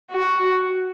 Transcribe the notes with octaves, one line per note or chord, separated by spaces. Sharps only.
F#4